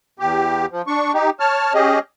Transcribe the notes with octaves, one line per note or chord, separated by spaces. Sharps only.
E2 G4
F3
D4 C#6
D#4 G4
C#5 A5 F6
C#4 G4 G#4 D#5